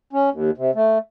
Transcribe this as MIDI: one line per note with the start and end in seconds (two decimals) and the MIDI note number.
0.13 0.30 61
0.31 0.50 39
0.57 0.71 48
0.75 0.98 57